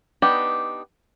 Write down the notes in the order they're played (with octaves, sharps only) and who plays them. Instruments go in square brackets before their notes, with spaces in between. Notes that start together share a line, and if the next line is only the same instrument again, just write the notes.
[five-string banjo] B3 D4 D#4 G4